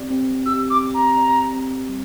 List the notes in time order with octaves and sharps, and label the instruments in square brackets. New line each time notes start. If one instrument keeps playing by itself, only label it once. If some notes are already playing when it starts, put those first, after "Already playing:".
Already playing: [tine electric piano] C4 G4 D5
C4
[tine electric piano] G4 [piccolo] E6
[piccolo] D6
[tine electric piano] C4
[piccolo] A#5
[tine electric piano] D5
C4
G3